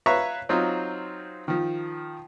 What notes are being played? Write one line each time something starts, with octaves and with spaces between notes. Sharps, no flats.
B4 C#5 E5 F5 A#5 C#6
F#3 C4 D#4 F4
D#3 F3